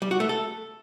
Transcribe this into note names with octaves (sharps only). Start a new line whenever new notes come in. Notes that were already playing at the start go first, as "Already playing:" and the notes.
G3
F#4
A3
A4